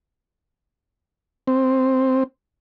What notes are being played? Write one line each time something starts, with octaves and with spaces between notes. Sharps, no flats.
C4